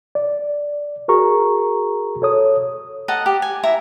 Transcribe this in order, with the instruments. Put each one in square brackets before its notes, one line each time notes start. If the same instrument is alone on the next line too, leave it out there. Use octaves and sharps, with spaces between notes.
[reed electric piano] D5
F#4 G#4 A#4 A#5 C#6
A4 C#5 D#6
[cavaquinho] A4 D#5 F#5 A#5
G4
G#5
E4 E5 A#5